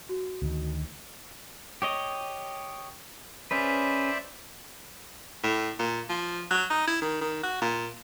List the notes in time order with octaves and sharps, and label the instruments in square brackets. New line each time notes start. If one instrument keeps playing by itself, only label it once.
[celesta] F#4
[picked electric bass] D2 D#3
[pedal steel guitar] G4 C#5 D#5
[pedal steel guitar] C#4 G#4 B4 [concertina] C5 D5 E5
[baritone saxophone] A2
A#2
F3
F#3
D#4
E4
D#3
D#3
F#4
A#2